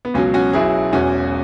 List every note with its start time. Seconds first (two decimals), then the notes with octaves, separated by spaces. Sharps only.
0.05 B3
0.14 C#2 B2 F#3 C#4
0.34 C#4 F#4
0.53 B1 B2 F#3 E4 G#4
0.93 E1 E2 E3 C#4 F#4